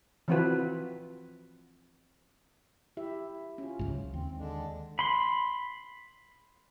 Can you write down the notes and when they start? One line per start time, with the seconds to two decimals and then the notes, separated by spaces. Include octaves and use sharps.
0.28 E3 F3 C4 F4 F#4 B4
2.97 E4 G4 E5
3.58 C#4 F4
3.79 C#2 G#2 F#3
4.13 D#2 C4
4.38 D3 G#3 D4
4.99 B5 C6